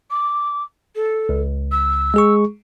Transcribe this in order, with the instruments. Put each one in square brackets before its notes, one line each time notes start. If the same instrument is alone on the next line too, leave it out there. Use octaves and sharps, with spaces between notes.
[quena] D6
A4
[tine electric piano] C#2
[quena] E6
[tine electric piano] G#3 G#4 C#6